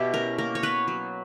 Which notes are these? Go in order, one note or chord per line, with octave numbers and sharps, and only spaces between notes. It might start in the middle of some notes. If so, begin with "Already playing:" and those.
Already playing: B2 E4 G4
C#4 A#4
A#3 A#4
C#5
B3 B4
F#3